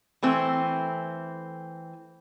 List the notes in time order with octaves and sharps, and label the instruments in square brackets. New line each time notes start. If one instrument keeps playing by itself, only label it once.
[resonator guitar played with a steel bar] E3 A3 C4